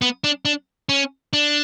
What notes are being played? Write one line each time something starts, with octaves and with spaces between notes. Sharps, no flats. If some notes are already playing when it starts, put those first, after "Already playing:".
B3
D4
D4
C#4
D4